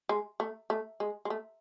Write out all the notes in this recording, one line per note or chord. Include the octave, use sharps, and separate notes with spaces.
G#3
A3
A3
G#3
G#3
A3